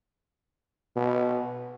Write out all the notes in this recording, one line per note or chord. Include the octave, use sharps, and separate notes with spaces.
B2